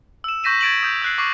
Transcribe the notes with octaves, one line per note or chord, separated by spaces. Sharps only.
E6 E7
C#6 G6 A#6 B6 D#7 E7
G#6 A6 D7 E7 F#7
D#6 G6
E6 F#6 C7
C#6 D6 C7